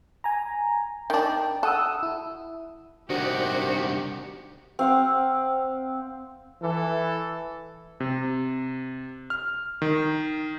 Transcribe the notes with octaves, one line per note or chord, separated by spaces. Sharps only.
G#5 A#5
D#3 D4 G5
A4 F#5 D#6 E6
E4
C2 D#3 D4 F#4 G4 C5
C4 F5 F#5
E3 A4
C3
F6
D#3